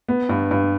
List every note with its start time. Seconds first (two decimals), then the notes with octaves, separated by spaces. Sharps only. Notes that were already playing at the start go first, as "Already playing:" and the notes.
0.08 B3
0.29 G2
0.51 G2